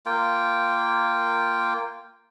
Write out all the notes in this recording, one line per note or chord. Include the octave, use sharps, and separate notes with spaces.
A#3 F4 G5